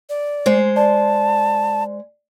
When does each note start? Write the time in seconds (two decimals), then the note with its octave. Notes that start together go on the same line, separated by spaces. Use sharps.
0.09 D5
0.46 G#3 C5
0.76 D5 A5